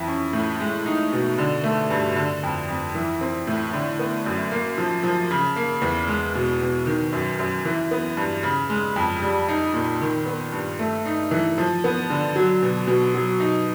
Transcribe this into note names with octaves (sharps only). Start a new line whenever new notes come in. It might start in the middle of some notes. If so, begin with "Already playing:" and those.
Already playing: F2 E3
C#4
A2
G#3
D#4
B2
D3
A3
G2
D3
F2
F2
E3
C4
A2
D3
B3
F#2
A#3
F3
F3
C#3
A#3
E2
G#3
B2
B2
D#3
F#2
F#2
E3
B3
G2
C#3
G#3
F2
G3
D#4
A#2
D#3
B3
G2
A3
D#4
E3
F3
B3
D3
F#3
B2
B2
F#3
D#4